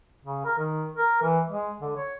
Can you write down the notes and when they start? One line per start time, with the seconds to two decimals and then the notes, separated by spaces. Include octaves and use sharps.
0.24 C#3
0.45 A#4
0.58 D#3
0.97 A#4
1.22 E3
1.49 G#3
1.81 D3
1.96 C#5